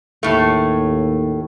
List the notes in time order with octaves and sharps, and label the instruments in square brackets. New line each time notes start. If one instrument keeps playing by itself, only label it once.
[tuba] D#2 [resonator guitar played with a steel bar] A2 A3